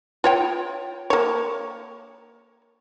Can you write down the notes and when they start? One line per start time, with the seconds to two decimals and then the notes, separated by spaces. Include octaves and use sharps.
0.24 F4 C#5 G5
1.10 A#3 C#5